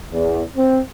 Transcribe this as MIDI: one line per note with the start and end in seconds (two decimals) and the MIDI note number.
0.12 0.42 40
0.57 0.80 60